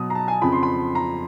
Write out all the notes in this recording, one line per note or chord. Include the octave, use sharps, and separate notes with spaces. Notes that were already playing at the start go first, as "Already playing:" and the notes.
Already playing: B2 F#3 D#6
A#5
A5
G#5
F2 C#3 F3 B5
C6
B5
A#5